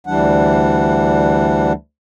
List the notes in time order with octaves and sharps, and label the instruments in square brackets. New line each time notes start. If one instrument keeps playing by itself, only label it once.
[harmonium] D2 E3 G3 D4 F#5